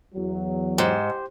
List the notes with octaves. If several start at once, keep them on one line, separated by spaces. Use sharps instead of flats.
E2 F#3
G#2 G4 C5